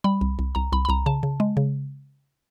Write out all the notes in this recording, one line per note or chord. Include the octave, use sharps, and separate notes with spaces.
G3 B5
C2
C2
C2 A#5
C2 B5
B5
C2 A#5
C#3 A5
C#3
G#3
C#3